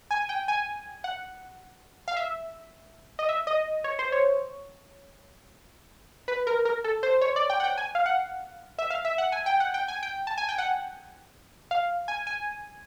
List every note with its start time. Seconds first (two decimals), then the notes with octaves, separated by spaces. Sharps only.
0.11 G#5
0.29 G5
0.48 G#5
1.04 F#5
2.08 F5
2.17 E5
3.19 D#5
3.29 E5
3.47 D#5
3.84 C#5
3.99 C5
4.12 C#5
6.28 B4
6.47 A#4
6.65 A#4
6.84 A4
7.03 C5
7.21 C#5
7.36 D5
7.50 G5
7.60 F#5
7.64 G5
7.78 G#5
7.95 F5
8.06 F#5
8.79 E5
8.90 F5
9.05 E5
9.18 F#5
9.32 G#5
9.46 G5
9.60 F#5
9.74 G5
9.88 G#5
10.03 G5
10.27 A5
10.38 G#5
10.49 G5
10.58 F#5
11.71 F5
12.08 G#5
12.27 G#5